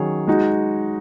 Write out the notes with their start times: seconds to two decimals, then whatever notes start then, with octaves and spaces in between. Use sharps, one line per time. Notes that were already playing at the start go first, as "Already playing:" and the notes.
Already playing: D#3 F#3 C#4 G#4 C#5
0.27 G#3 D#4 F#4